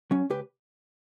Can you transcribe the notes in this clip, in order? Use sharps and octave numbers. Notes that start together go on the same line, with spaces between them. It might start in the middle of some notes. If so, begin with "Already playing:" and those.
F#3 C#4
C#2 G4 B4